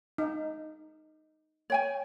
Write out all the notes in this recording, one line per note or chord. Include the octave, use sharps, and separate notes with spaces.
D#4
C#5 G5 G#5